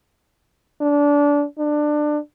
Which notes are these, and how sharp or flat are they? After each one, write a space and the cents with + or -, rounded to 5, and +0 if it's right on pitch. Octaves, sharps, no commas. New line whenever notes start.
D4 -20
D4 +20